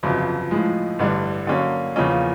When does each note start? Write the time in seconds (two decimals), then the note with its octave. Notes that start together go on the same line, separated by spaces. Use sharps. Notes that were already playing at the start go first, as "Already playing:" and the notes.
0.03 G1 F2 C#3 F#3
0.51 A2 F3 G#3
0.99 A1 G2 D3 G3
1.47 D3 F#3 A#3 C#4
1.96 E2 C#3 F3 A#3 C#4